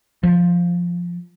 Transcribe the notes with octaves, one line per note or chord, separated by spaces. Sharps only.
F3